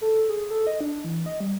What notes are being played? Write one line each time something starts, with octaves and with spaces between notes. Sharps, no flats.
A4
G#4
A4
D#5
D4
E3
D#5
G3